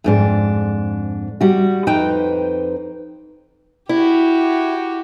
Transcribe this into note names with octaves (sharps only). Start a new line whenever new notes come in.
F2 G#2 D4
G3 F#4
F2 D#4 B4 C5 G5
E4 F#4 G4